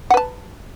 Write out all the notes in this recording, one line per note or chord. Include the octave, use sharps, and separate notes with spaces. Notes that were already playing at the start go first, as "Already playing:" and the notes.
B4 F#5 A5